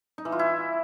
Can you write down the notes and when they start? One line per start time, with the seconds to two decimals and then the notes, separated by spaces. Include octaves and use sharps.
0.18 D#4
0.25 E3
0.32 F4
0.39 E4